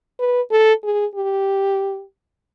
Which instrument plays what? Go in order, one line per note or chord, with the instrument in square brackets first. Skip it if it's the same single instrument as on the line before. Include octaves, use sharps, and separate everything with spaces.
[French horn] B4
A4
G#4
G4